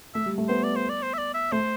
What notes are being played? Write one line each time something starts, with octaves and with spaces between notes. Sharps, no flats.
A3 E5
G3
A3
B3 C5
D5
C5
D5
C5
E5
D5
E5
A3 C5